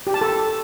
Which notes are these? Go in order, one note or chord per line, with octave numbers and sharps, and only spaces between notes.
G4
A5
A4